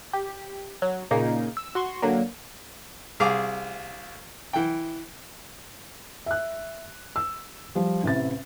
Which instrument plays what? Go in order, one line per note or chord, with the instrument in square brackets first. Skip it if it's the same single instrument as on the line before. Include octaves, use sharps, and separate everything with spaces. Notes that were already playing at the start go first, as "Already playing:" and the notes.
[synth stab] G4
F#3
A#2 C#3 A#3 D#4
E6
F#4 C6 C#6
D3 F#3 A#3
[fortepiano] C2 G#4 F5 D6
E3 G5
[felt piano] E5 F#6
E6
F3 G3
A1 C3 E4 A6